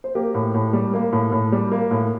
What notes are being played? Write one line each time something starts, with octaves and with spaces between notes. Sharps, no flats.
C5
A#3 G4 A#4
A2
A2
G3
A#3
A2
A2
G3
A#3
A2